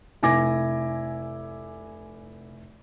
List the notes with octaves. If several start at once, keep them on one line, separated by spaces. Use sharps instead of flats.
F1 E4 G#5 D6 A#6